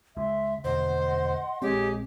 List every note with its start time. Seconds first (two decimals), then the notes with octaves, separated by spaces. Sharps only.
0.17 C#2 G#3 E5 C6
0.64 E1 D2 C5 D#5 F#5 C6
1.62 A#1 G#3 C4 G4 G#4 C#5 D#5